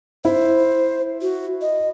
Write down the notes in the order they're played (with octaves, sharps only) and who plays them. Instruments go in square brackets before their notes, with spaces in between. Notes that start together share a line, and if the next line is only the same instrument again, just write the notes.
[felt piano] E4 [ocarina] C5
[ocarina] F#4
D#5